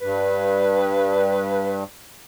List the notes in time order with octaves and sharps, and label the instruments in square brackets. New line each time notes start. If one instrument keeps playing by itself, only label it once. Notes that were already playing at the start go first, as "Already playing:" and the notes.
[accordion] G2 [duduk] B4